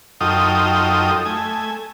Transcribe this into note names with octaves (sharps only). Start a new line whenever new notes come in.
F#2 D#4 F4 A4 G5 D#6
A3 G#5